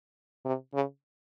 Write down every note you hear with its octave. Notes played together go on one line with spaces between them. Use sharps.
C3
C#3